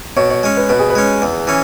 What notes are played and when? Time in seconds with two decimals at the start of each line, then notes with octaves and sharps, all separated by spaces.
0.16 B2 C#5
0.30 C#5
0.43 G#3 C#4
0.57 B4
0.69 B2 B4
0.79 G#4
0.90 B4
0.95 G#3 C#4
1.22 E2
1.47 E3 C#4